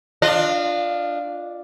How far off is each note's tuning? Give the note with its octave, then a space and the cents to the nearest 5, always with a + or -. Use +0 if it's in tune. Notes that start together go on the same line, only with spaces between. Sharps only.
D4 +0 F4 +0 D#5 -30